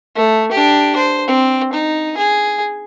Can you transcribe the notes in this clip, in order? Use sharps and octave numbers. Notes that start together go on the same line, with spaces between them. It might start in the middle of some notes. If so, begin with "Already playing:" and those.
A3
D4 G4
C5
C4
D#4
G#4